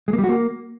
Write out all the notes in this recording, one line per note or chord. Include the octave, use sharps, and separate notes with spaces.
G#3
A#3
G3
F#4
A#3